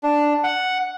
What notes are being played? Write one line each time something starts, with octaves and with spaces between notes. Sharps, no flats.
D4
F#5